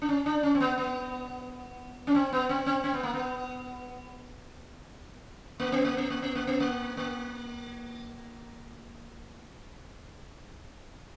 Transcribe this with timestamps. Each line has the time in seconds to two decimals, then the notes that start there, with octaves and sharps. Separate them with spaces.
0.02 D4
0.09 C#4
0.26 D4
0.43 C#4
0.55 C4
0.60 B3
0.78 B3
2.07 C#4
2.15 C4
2.32 B3
2.49 C4
2.66 C4
2.84 C4
2.94 B3
3.03 A#3
3.14 B3
5.60 A#3
5.72 B3
5.84 A#3
5.97 B3
6.10 A#3
6.22 B3
6.35 A#3
6.47 B3
6.60 A#3
6.97 A#3